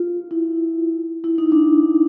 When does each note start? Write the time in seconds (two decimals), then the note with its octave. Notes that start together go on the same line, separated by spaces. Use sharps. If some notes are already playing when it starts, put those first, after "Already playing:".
Already playing: F4
0.31 E4
1.24 E4
1.38 D#4
1.52 D4